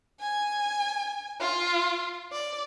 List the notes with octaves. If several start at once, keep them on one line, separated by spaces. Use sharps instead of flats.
G#5
F4
D5